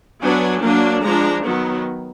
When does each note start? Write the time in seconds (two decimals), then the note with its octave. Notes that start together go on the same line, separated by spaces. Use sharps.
0.22 F#3 B3 D4 G#5
0.63 F#3 A#3 D4
1.03 F3 G#3 D4 A#5
1.44 D#3 F#3 B3